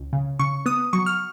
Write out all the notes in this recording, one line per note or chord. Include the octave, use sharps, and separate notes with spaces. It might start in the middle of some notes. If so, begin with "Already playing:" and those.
Already playing: C#2
C#3
C#3 C#6
B3 D#6
F#3 C#6
F6